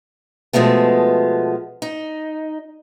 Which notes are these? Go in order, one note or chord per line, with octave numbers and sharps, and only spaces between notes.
B2 F3 G#3 A3 B3
D#4